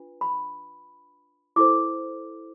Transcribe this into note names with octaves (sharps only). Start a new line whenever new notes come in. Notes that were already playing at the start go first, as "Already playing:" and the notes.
Already playing: D4 F4 B4
B5
E4 A4 C5 D6